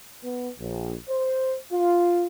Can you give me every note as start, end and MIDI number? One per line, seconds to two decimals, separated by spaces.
0.23 0.49 59
0.59 0.94 34
1.08 1.55 72
1.72 2.26 65